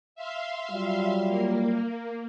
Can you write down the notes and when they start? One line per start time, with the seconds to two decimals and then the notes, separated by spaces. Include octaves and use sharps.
0.15 E5 F5 C6
0.71 F#3 G3 F4
1.27 A#3